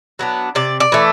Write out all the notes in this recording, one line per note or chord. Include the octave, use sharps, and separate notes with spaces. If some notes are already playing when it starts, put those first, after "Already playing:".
F#3 B3 D4
C3 D5
D5
E3 A3